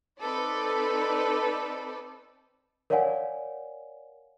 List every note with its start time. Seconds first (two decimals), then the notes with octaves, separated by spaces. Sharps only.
0.20 C4 D#4 A4 B4 D5
2.90 A#4 C#5 D5 F5 F#5 G#5